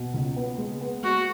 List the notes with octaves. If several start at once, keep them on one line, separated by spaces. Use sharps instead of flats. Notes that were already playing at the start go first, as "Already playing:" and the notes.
Already playing: B2
C#2
B3
G#3
B3
G#3 F#4